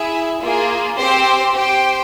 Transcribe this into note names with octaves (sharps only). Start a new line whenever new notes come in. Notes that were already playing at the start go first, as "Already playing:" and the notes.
Already playing: E4 G#4 E5
A#3 F4 G#4
C4 G4 C5
G4 C5 G5